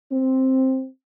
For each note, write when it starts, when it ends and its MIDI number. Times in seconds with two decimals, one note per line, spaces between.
0.13 0.86 60